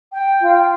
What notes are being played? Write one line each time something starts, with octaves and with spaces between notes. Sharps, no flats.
G5
F4